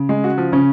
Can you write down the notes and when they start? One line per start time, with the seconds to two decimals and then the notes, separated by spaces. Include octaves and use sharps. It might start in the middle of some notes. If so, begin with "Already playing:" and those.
Already playing: C#3
0.09 G#3
0.24 F#4
0.38 F3
0.52 C#3 C#4